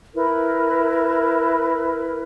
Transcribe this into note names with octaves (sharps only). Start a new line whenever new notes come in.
E4 A#4 B4